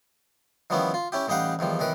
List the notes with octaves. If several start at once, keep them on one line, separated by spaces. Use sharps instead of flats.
D#3 F3 G3 B3 C#4 E4
F4
C#4 E4 G4
A1 G3 D#4 G4 F5 F#5
E2 D#3 F3 G3
B1 D#3 E3 A#4 B4